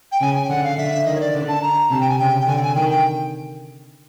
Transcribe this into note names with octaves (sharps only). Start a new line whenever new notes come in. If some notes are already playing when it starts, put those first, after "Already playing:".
G5
C#3 G#5
G#5
G5
D3 F#5
F5
D3 E5
D#3 D#5
C#5
D5
D3
A5
A#5
C3 A5
G5
G#5
C#3 G5
G5
D3 G#5
G5
G#5
D#3 G5
G5